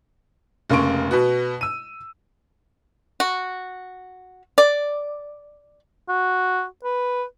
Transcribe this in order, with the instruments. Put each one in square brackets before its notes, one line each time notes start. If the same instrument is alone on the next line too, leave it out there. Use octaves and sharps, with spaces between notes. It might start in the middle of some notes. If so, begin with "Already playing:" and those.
[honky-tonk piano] F1 C#3 A#3 C6 C#6 D7
B2 B3 F#4
E6 D#7
[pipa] F#4
D5
[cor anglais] F#4
B4